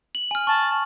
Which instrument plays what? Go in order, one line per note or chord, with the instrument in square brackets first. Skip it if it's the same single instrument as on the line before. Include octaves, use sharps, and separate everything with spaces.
[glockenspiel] F#7
G#5 F6
[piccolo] A5 [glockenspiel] C#6